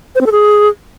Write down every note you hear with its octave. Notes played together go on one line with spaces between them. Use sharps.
C5
C4
A4
G#4